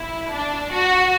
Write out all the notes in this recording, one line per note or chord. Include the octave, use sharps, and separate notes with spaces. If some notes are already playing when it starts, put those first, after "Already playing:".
Already playing: E4
D4
F#4